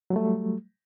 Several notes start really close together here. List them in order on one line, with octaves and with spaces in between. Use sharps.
F#3 G3 A3